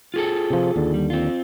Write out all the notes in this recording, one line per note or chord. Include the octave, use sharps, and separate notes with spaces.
F4 G#4 A4
C3 F3
D#2 D3
G3
C4 F4